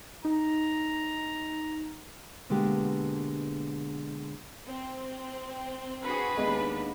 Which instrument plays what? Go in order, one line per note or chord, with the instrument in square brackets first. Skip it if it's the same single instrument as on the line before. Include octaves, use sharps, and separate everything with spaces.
[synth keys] D#4 [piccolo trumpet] A#5
[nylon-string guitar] B2 D3 G#3 A#3 B3 G4
[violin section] C4
[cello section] D4 F#4 G#4 [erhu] B4
[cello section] D#2 D4 [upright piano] G#3 B3 D#5